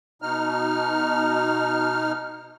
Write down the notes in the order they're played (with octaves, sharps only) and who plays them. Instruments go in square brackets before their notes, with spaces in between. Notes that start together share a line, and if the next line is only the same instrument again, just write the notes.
[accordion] B2 D#4 F6